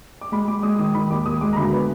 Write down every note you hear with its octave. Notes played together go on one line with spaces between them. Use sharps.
D6
G#3 B5
G#3 D6
D6
G#3 D#6
D#3 D#6
D#3 B5
D#2 D6
D#2 D#6
G#3 D6
A#5
D2 B5
B3